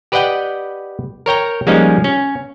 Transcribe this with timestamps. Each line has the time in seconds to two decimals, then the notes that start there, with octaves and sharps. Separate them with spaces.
0.12 G4 B4 D5 D#5 F#5 G5
1.26 A#4 C#5 G5 A#5
1.67 F3 G3 G#3 A#3 C#4 D#4
2.04 C#4